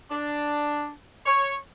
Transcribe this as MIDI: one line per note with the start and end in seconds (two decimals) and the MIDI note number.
0.11 0.90 62
1.26 1.56 73